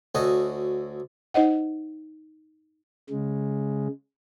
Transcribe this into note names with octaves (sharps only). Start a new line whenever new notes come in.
D2 C#4 F#4 A4 D#5
D#4 C5 D#5 F#5
C#3 G#3